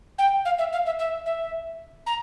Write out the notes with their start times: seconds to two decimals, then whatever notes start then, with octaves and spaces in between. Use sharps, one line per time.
0.18 G5
0.45 F5
0.59 E5
0.73 F5
0.86 E5
0.99 E5
1.26 E5
2.07 A#5